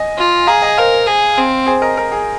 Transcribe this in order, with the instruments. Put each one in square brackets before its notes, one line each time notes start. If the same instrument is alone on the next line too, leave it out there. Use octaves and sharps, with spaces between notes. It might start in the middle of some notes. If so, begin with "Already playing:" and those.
Already playing: [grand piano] D#5 G#5
[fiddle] F4
[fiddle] G#4 [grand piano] F5 A#5
[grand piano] D#5 G#5
[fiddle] A#4 [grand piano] C5 F5
[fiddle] G#4
C4
[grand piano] G#4 C5
A#4 D#5
A#4
G#4